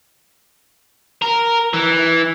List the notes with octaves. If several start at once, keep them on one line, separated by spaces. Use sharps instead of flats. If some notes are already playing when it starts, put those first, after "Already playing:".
A#4
E3